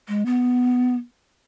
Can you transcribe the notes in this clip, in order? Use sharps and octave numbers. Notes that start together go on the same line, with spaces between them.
G#3
B3